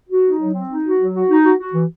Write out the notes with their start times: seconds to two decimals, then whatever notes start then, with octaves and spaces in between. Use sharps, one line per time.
0.09 F#4
0.25 D#4
0.39 F#3
0.53 C4
0.70 D#4
0.84 F#4
0.99 F#3
1.13 F#4
1.29 D#4
1.44 F#4
1.58 F#4
1.73 E3